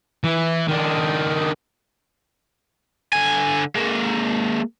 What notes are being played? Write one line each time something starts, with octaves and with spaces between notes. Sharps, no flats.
E3
D#3 D4
D3 G#5
G#3 A#3